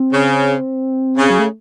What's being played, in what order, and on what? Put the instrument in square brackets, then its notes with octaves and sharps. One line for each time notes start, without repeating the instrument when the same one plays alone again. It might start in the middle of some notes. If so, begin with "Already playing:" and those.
Already playing: [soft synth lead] C4
[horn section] C#3
C#3
[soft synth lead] F#3
A3